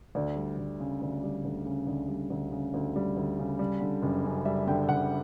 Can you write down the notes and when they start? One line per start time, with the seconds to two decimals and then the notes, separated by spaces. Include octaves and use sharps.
0.15 D2 D5
0.36 G3
0.58 D2
0.80 C#3
1.02 D2
1.23 G3
1.45 D2
1.66 C#3
1.87 D2
2.08 G3
2.30 D2
2.51 C#3
2.74 D2
2.96 G3
3.17 D2
3.39 C#3
3.59 G3
3.81 D3
4.02 F#1
4.25 F#2
4.45 G3 E5
4.67 D3 G5
4.88 F#1 F#5